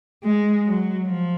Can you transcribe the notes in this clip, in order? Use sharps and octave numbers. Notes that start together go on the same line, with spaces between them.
G#3
F#3
F3